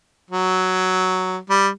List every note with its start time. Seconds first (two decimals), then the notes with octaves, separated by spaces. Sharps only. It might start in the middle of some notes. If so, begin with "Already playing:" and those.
0.31 F#3
1.50 G3